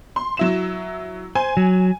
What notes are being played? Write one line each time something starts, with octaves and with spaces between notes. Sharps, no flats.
C6
F#3 E4 E7
C5 G#5
F#3